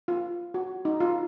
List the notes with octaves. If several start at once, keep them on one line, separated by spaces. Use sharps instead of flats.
F4
F#4
D#4
F4